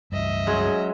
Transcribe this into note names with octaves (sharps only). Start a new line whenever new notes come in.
C#2 G2 D#5 E5
F#3 G#3 C#4